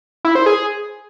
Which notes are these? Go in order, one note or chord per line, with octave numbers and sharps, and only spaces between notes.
E4
C5
G#4